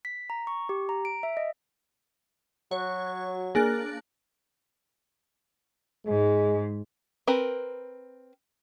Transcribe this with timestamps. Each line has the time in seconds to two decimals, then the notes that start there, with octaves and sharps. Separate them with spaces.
0.05 B6
0.30 A#5
0.47 C#6
0.69 G4
0.89 A#5
1.05 D7
1.23 E5
1.37 D#5
2.71 F#3 F#4 C#5
3.55 A#3 D4 G#4 A#4 G#5 F#6
6.07 G#2 G#3
7.27 C4 A#4 B4